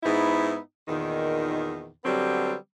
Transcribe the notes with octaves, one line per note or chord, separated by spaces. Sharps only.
G#2 B3 D#4 E4
E2 A#2 D#3
D3 F#3 G3 B3 C4